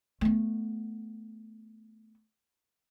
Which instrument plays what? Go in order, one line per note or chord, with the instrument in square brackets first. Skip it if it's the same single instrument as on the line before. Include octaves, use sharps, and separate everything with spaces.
[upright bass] A3 B3